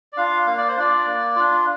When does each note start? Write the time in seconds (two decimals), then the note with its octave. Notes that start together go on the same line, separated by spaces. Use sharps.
0.12 D5
0.17 D4 F4 F5
0.46 A#3 F5
0.57 D5
0.68 C5
0.77 D4 F4 D5
1.06 A#3
1.36 D4 F4